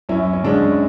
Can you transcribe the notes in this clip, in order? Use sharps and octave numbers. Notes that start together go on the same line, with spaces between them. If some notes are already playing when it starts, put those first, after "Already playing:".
F#2 C#4 E4
C#4
D3 G#3 C#4 D4